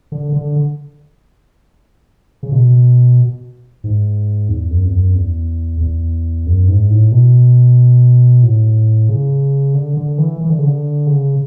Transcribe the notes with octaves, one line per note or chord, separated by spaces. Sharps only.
D3
D3
C#3
B2
G#2
E2
F#2
E2
F#2
E2
E2
F#2
G#2
A2
B2
A2
C#3
D3
D3
E3
E3
D3
C#3
D3
C#3